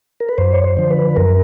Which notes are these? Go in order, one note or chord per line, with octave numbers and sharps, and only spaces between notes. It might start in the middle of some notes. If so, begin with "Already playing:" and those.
A#4
B4
F#2 C5
C#5
C5
D3 F3
B4
F#2 A#4